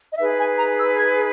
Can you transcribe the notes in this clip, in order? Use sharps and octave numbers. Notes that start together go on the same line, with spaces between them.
D#5
D#4 G#4 B4 E5
G#5
A#5
E6
G#6